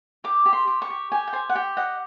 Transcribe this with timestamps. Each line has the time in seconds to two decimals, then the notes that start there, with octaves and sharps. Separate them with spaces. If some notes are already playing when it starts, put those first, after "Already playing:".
0.24 G4 D6
0.46 G4
0.53 C6
0.67 G4
0.82 C#6
0.90 G4
1.12 G4 G#5
1.27 G5
1.33 C5 G#5
1.50 F#5
1.55 G4 G5
1.77 D#5 F#5